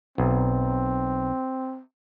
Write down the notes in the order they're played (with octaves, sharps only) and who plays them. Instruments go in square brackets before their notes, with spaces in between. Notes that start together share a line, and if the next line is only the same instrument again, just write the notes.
[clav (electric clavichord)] B1 [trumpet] C4